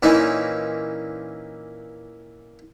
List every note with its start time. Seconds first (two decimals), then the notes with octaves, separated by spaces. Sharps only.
0.03 A#2 E3 C#4 D#4